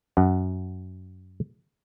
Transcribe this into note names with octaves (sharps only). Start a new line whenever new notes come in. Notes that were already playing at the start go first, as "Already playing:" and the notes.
F#2 F#5